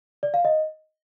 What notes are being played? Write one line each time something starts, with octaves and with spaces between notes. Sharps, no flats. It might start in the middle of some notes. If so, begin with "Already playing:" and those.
D5
F5
D#5